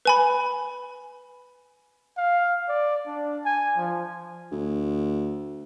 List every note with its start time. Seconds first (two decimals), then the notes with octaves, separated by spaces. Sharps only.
0.05 B4 G#5 B5
2.18 F5
2.69 D5
3.07 D4
3.45 G#5
3.77 F3
4.51 D2